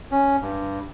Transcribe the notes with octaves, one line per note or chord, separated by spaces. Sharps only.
C#4
G2